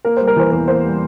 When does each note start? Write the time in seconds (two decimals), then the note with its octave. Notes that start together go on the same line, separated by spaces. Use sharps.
0.05 A#3 A#4
0.17 G3 C5
0.27 A#4
0.36 E3 C5
0.52 E2 A#4
0.68 A#3 C5
0.84 G3